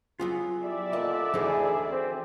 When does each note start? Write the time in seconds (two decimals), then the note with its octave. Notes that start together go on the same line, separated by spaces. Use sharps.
0.20 F#3 B3 F4 G#4
0.63 G3 E4 D5 E5
0.93 A#2 D3 D#5
1.34 D2 E3 D#4 G#4
1.90 C4